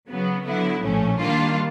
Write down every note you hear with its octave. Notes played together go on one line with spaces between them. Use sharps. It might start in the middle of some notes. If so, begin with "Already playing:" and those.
C#3 F#3 B3
D3 F#3 B3 E4
A#1 A2 F3 A3 C#4
D#3 G3 A#3 D4 F4